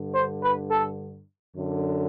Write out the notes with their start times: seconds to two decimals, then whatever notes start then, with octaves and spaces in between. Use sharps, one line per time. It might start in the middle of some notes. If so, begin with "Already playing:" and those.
Already playing: G2 D3
0.15 C5
0.43 B4
0.71 A4
1.57 F#2 D3